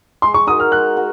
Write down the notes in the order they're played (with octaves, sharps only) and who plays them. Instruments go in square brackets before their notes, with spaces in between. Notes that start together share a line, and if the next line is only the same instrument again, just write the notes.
[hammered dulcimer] G#3 [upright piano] C6
[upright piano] C#6
[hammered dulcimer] D#4 F#4 A#4 [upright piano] D#6
[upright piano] F6
[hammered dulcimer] G#3 [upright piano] F#6
[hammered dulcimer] F#4 A#4